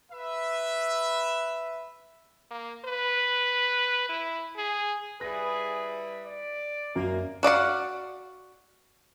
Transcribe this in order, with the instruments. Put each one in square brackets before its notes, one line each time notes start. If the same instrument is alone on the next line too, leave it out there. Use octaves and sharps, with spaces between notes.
[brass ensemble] B4 E5
[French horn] A#3
B4
E4
G#4
[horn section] G3 E4 B4 [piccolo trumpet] G#4 [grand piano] A#6
[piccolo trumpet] D5
[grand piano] F#2 [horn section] A#3
[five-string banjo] F#4 D5 F5 F#5